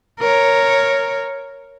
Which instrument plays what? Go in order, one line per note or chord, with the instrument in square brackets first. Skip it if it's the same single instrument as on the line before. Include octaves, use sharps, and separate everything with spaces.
[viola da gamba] A#4 C#5